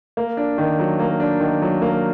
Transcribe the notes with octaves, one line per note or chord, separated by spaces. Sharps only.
A#3
D4
D#3
F#3
A#3
D4
D#3
F#3
A#3